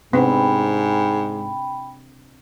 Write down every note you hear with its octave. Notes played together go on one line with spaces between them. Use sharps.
G#2 C3 B3 C4 D4 G5 B5